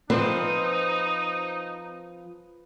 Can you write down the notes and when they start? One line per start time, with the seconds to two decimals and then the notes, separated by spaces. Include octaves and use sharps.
0.10 F3 C4 D#4 B4